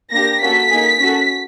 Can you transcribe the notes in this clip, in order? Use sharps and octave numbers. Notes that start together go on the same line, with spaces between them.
A#3 D4 G4 A#6
A#3 C#4 F#4 A4 B6
A#3 D#4 G#4
C#4 F#4 A4